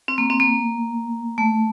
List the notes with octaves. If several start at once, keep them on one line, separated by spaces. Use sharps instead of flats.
C4
A#3
C4
A#3
A3